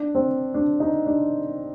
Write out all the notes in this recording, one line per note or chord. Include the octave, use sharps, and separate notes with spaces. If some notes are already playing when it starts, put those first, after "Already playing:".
Already playing: D4
C4
D4
D#4
D4